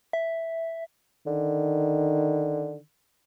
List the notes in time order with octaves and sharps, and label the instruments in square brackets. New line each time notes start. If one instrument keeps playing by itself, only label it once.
[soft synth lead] E5
[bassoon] D3 [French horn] D#3